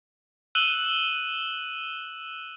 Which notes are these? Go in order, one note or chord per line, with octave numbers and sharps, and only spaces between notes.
E6 F#6 D#7 E7 F#7 G7